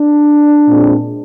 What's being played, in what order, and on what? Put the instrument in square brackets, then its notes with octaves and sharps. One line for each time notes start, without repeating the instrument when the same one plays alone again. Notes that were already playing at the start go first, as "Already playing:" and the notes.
Already playing: [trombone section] D4
A#2 G#3 C4